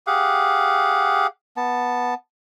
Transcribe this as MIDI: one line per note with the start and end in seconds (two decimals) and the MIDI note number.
0.07 1.27 67
0.07 1.27 68
0.07 1.27 77
0.07 1.27 78
1.57 2.14 59
1.57 2.14 81